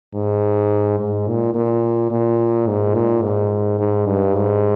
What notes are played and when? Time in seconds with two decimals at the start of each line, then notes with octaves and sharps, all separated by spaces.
0.14 G#2
0.99 G#2
1.27 A#2
1.54 A#2
2.11 A#2
2.67 G#2
2.94 A#2
3.22 G#2
3.79 G#2
4.06 G2
4.35 G#2